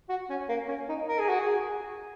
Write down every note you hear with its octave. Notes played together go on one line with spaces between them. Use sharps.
F#4
C#4
A#3
C#4
D#4
A#4
G#4
F#4
G#4